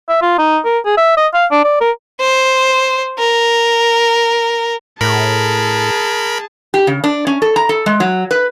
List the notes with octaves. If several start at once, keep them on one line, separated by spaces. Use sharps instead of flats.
E5
F4
D#4
A#4
G#4
E5
D#5
F5
D4
D5
A#4
C5
A#4
A2 G#4 A#4 A5 B5
G4
C#3
D4
C#4
A4
A#5
A4
G#3
F#3
B4